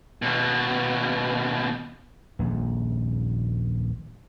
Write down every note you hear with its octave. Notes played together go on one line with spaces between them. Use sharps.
D#2 B2
D#1 A#1 F2